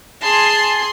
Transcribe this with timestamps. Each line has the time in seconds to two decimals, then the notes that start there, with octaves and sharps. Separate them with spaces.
0.24 G#4 A5 C6